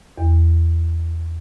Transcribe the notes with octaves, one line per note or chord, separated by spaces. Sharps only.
E2